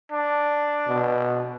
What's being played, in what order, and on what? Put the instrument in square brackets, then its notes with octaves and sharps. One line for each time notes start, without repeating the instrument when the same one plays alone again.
[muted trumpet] D4
[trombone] B2